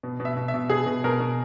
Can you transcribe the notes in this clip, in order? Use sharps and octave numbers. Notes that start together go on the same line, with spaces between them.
B2
B2
E5
B2
E5
B2
B2 G#4
B2
B2 A#4
B2